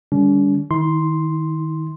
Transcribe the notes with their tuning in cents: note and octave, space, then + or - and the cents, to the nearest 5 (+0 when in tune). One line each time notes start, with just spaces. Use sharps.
D3 +45 G3 +30 C#4 +45
D#3 +0 E4 -40 C6 +0